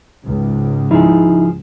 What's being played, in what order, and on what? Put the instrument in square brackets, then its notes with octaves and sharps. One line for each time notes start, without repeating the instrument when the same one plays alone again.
[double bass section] C#2 G#2
[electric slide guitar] F3 G#4 [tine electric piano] D#4 E4